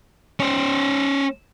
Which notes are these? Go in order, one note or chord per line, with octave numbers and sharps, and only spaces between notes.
C#4 C5